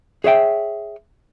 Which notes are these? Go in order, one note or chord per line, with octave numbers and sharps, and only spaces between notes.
G#4 C#5 E5 G5